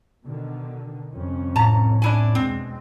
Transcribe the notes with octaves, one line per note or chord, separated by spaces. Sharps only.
B2 D3 D#3
C2 F2 C#4
A2 A5 A#5
D4 E4 G#5
E2 B2 G#3 C4